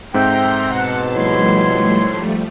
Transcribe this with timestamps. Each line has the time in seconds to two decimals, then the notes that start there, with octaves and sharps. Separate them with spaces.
0.14 G#2 C4 A4 E5 G5 A#5 C6
0.71 B2 F#5 A5
1.13 F3 G3 A3 E4 C#5 C6